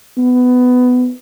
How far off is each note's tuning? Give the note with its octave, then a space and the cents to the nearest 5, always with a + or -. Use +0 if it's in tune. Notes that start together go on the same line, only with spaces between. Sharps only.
B3 +15